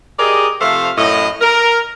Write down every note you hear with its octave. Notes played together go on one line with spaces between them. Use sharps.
G4 G#4 A#4 D5 D#5
C3 F3 A3 C5 F5
F#2 A2 D#5
A#4